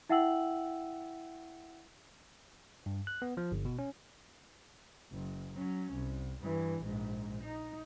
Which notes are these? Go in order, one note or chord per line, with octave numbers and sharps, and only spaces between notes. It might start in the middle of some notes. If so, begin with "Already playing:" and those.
E4 E5 F#5 G5 E6 F#7
G2
F#6
B3
F3
G1
B2
C#4
F#1
F#3 C#4
C2
G2 E3
A#1 G#2
D#4